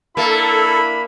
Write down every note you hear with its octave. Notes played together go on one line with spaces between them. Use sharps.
A#3 D4 E4 A4 B5